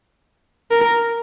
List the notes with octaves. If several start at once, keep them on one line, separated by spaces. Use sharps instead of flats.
A#4